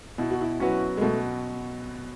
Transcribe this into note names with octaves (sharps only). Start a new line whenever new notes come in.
B2 E4
F#4
E4
F#3 C#4 F#4 B4
G#3
B2 A3